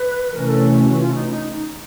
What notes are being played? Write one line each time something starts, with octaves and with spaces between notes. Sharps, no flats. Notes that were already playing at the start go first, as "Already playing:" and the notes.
Already playing: B4
C3 E3 A3 C#4 A#4
A4
F#4
F4
D#4
D#4